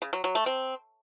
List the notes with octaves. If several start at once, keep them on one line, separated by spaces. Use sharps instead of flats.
C#3
F#3
F#3
A3
C4